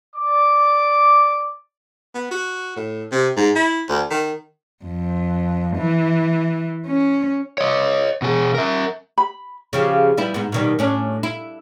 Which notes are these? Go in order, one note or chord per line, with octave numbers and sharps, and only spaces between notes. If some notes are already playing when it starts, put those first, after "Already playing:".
D5 D6
B3
F#4
A2
C3
G#2
E4
D2
D#3
F2
E3
C#4
C#5 D#5
B2 G#4
A#4 E5
B5
C#3 F3 G4
G3 B3 E4
G#2 B3
B2 D#3 G3
A2 C#4 D4
E4